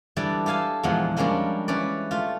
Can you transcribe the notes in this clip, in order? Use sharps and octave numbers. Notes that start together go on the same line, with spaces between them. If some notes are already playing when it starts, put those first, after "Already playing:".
E3 G3 D4 A4 D5
G4 A4 F5 G#5 A5
E2 A#2 F3 G#3 F#5 C6
F3 G3 G#3 A#3 C#4 D4
E3 C#4 B4 D5
A3 F4